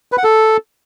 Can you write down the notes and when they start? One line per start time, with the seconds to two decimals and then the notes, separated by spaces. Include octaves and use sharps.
0.12 B4
0.18 F#5
0.24 A4